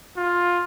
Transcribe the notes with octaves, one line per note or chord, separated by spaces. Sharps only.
F4